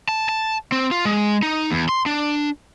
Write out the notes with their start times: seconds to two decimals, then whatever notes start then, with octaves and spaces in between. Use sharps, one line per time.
0.09 A5
0.29 A5
0.72 C4
0.91 F4
1.05 G#3
1.43 D#4
1.70 E2
1.89 C6
2.06 D4